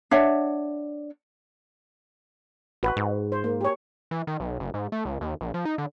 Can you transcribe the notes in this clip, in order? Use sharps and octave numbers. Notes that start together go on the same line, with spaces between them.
D4 C#5 E5 F#5
A1 F#4 B4
G#2
C5
A#3
G4 C#5
E3
D#3
B1
F#1
G#2
A3
C#2
D#2
A#1
F3
D#4
D3